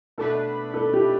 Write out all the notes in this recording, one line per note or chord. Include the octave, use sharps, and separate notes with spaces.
B2 A3 D4 A4 B4
A4
G4